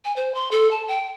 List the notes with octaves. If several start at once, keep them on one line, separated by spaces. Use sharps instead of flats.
G#5
C5
C6
A4
A5
G5